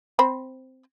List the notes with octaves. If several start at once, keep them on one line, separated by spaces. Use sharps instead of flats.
C4 C5 B5